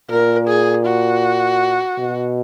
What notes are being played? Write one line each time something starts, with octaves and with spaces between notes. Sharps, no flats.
A#2 A#4
G#4
F#4
B2